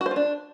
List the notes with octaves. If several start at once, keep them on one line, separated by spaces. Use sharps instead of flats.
F#4
C5
F4
D4